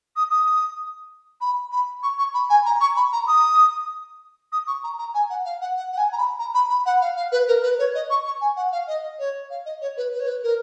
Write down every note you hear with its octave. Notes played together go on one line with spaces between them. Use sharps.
D#6
D#6
B5
B5
C#6
C#6
B5
G#5
A#5
C#6
B5
A#5
D#6
D#6
C#6
A#5
A#5
G#5
F#5
F5
F#5
F#5
F#5
G#5
A#5
B5
A#5
B5
B5
F#5
F5
F5
B4
A#4
B4
C#5
D#5
C#6
C#6
G#5
F#5
F5
D#5
C#5
F5
D#5
C#5
B4
B4
C#5
B4
A#4